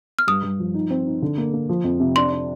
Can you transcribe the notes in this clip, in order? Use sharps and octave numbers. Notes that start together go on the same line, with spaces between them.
F6
G2 D#6
G2
F3
D#4
C4
D#4
D3
A#3
A#3
F3
F2
C3
D4 C6
D4